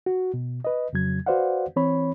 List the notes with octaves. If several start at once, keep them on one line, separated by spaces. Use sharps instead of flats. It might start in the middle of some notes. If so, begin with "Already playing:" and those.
F#4
B2
B4 D#5
F2 C#3 F#3 G#6
F#4 B4 C5 D5 F5 F#5
E3 C4 C#5 B5